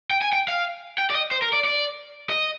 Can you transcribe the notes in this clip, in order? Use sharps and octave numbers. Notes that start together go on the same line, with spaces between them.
G5
G#5
G5
F5
G5
D5
D#5
C5
A#4
D5
D5
D#5